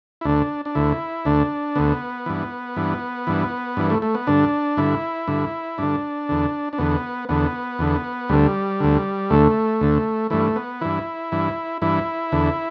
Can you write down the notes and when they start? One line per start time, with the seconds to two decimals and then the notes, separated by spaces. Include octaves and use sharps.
0.21 E4
0.25 D2 D3 D4
0.65 D4
0.75 D2 D3 E4
1.25 D2 D3 D4
1.75 D2 D3 B3
2.26 G2 E3
2.76 G2 E3
3.27 G2 E3
3.77 G2 E3
3.90 A3
4.02 A3
4.15 B3
4.27 G2 D3 D4
4.77 G2 D3 E4
5.28 G2 D3
5.78 G2 D3 D4
6.29 E2 D3
6.73 D4
6.78 E2 D3 B3
7.29 E2 D3 B3
7.79 E2 D3
8.29 D2 D3 G3
8.80 D2 D3
9.30 D2 D3 A3
9.81 D2 D3
10.30 G2 E3 A3
10.56 B3
10.81 G2 E3 E4
11.32 G2 E3
11.82 G2 E3 E4
12.32 E2 D3